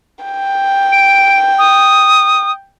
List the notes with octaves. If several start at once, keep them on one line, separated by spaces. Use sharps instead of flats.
G5
D7
D#6